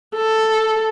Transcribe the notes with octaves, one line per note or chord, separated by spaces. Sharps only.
A4